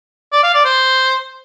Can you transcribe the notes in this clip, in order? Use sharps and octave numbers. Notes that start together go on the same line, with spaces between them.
D5
F5
D5
C5